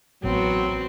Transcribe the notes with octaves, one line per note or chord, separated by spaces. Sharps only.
A1 A2 F#3 B3 C4 F#4